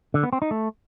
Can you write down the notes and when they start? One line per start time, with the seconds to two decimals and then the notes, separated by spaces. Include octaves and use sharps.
0.14 D3
0.23 B3
0.33 C4
0.42 D#4
0.51 A3